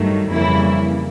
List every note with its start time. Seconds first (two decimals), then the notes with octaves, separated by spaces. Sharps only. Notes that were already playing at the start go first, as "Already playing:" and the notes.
Already playing: G2 D#3 F#3 A3
0.30 F2 C#3 E3 G3 A#3 E4